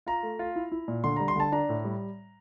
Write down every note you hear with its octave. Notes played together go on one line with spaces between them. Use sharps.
F4 A#5
A3
F4
E4
E4
A#2
D3 C6
G3 A#5
C6
D3 A5
D4 A#5
A2
G3